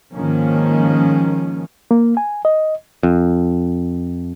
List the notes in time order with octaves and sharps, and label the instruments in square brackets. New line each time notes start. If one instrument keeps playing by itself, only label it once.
[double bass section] G#2 D#3 F3 A#3 C#4
[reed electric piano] A#3
G#5
D#5
[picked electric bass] F2